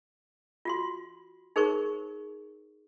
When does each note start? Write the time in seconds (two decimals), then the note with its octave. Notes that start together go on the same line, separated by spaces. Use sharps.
0.65 F4 F#4 C6
1.56 D#4 G#4 A#4 C5 C#6